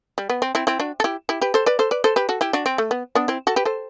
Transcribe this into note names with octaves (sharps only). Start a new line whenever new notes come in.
G3
B3
C4
C4 E4
C4 E4
D4 F#4
A4
E4 G4
E4 G4
G4 B4
A4 C5
B4 D5
A4 C5
B4 D5
A4 C5
G4 B4
F#4 A4
E4 G4
D4 F#4
C4
A3
B3
B3 D4
C4 E4
F#4 A4
G4 B4
A4 C5